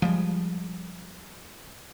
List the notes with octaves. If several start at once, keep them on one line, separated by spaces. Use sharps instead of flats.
F3 G3 G#3